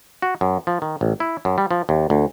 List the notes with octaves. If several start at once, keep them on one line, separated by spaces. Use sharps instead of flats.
F#4
F#2
F3
D#3
A1
E4
F#2
G3
F3
D#2
D2